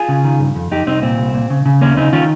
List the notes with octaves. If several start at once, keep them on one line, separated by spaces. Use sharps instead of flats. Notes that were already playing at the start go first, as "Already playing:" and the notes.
Already playing: F4 G#4
C#3
D#3
G2
F2
F2 D#4 G4
C2 C4 D#4
A#2 C4
C2
A#2
C#3
C#3
D#2 A#3 C#4
C#3 C4 D#4
D#3 C#4 F4